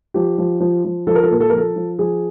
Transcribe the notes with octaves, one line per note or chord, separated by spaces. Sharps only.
F3 G4
F3
F3
F3
F3 A4
A#4
A4
A#2 A#4
A4
F3 A#4
A4
F3
F3 G#4